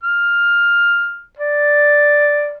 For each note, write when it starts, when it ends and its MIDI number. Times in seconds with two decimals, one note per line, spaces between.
0.03 1.23 89
1.39 2.58 74